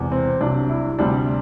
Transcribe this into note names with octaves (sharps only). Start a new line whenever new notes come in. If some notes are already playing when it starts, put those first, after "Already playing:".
Already playing: E1 E2 C3
C4
C2 C3 F#3 D4
E4
D2 C3 G3 D4